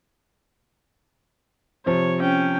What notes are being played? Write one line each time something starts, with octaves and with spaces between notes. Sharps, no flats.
C3 F3 C#5
C#4 G5